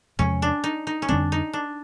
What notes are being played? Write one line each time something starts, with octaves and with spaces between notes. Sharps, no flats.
E2 C3 F3 G#3 C#4
D4
D#4
D#4
C#4
F2 D3 G3 C4 D4
D#4
D4